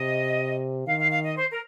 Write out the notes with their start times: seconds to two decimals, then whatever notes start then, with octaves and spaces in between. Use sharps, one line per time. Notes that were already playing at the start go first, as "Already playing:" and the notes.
Already playing: C3 D#5
0.86 D#3 F5
1.00 F5
1.11 F5
1.25 D#5
1.37 C5
1.50 A#4